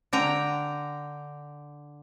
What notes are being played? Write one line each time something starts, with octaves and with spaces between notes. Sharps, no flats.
D3 G5 A#5